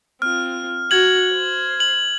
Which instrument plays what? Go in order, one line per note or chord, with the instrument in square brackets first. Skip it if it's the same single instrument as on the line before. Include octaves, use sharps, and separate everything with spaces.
[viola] C4 F4 [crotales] F6
[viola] F#4 [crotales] G#6 F#7
[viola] C5
[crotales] F#7